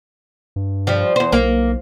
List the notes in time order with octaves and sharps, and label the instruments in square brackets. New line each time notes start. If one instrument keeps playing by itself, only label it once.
[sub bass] G2
[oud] F3 G3
E2 C5
[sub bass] B1 [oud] A#3